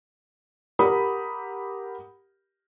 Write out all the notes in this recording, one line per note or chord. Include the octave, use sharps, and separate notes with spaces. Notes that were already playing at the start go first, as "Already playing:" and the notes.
G4 A#4 F#5 B5 D#6